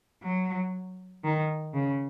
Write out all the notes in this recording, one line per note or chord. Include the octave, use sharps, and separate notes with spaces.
F#3
D#3
C#3